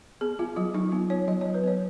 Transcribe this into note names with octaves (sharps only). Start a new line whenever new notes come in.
B3 G#4
B3 F4
F#3 F4
F#3 D#4
B3 F4
B3 C#5
F#3 D#5
F#3 C#5
B4
B3 C#5